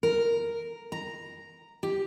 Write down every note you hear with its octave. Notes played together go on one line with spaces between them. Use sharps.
A#4
A#5
G4